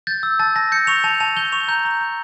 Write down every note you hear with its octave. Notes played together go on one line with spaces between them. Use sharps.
G6 A6
E6
A5 A6
A5 A#6
G6 C#7
C#6 F7
A5 F7
A5 F7
G6 G7
C#6 F7
A#5 G6
A#5
G6